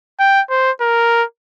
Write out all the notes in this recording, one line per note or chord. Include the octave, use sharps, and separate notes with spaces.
G5
C5
A#4